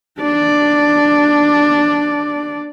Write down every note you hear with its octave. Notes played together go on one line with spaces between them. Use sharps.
D4 D5